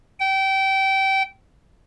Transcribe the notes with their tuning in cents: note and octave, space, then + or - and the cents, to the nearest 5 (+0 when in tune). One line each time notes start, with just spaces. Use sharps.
G5 -25